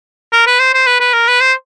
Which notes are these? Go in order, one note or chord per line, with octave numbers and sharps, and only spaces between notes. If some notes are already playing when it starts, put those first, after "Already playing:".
A#4
B4
C5
C5
B4
B4
A#4
B4
C5